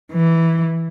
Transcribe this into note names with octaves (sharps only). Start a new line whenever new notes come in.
E3